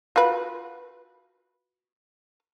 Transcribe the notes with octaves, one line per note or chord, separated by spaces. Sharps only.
F4 F#4 B4